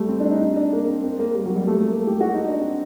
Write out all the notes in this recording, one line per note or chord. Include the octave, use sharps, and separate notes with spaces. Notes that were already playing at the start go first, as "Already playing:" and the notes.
Already playing: G3 A3
C4
D4
D#4
D#4
D4
A#3
C4
C4
A#3
G3
F#3
G3
A3
A3
A#3
G4
F#4
D#4
D4
C4